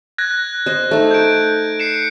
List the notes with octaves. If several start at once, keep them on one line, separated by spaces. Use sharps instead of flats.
F#6 G#6 A#6
C5 D#5
A3 D#4
G6 D7
C7 C#7 E7